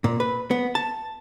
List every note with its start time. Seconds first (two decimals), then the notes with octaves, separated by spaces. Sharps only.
0.04 A#2
0.20 B4
0.51 B3
0.75 A5